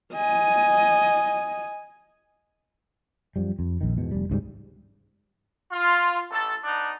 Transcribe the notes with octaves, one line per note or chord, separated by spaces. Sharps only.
D#5 G#5
F#2 F3 G3
F2
A#1 D#3
E2 G#2 B2
F1 G3
C#2 G#2 G3
F4
A1 A4
B3 D4 D#4